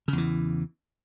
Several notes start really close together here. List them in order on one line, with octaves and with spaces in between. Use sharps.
C#3 E2 E3